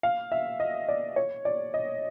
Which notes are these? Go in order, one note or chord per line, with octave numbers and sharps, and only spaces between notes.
F5
E5
D#5
D5
C#5
D5
D#5